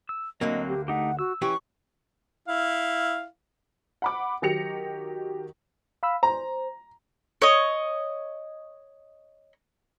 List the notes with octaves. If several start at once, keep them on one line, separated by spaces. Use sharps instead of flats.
E6
D2 D3 F#3 A#3 C4 D#5
G4
A3 D#4 G4 F#5
F#4 E6
E3 C#4 G4 C#6
E4 F5
F#5 B5 D6
D#3 F#3 G4 A#6 C#7 F7
F5 B5 E6
C5 A#5
C#5 D#5